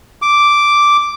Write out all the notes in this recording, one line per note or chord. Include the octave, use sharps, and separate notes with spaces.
D6